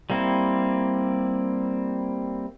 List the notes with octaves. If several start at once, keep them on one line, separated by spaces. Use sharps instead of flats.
G3 A#3 C4 E4